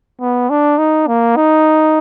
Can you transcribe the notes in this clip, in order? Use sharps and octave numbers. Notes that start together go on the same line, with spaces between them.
B3
D4
D#4
A#3
D#4